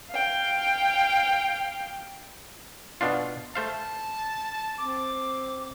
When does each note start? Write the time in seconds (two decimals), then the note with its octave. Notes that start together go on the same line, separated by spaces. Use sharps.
0.11 F5 G5
3.01 B2 D4 F4
3.55 A3 C5 F5 A5
4.78 C4 D6